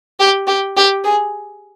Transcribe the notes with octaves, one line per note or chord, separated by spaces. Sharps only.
G4
G4
G4
G#4